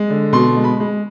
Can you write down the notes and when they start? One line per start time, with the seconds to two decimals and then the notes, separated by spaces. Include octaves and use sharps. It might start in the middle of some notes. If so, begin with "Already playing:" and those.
Already playing: G#3
0.10 D3
0.33 B2 C6
0.57 G#3
0.64 B5
0.80 G#3